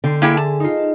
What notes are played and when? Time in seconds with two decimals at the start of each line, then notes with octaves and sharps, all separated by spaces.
0.04 D3 G5 C6
0.22 A#3 E4 G#4 G5
0.37 A5
0.60 D#4 F4